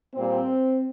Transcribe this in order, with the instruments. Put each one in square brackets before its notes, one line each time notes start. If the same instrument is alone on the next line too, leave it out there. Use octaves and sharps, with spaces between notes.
[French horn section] A#2 G3 C4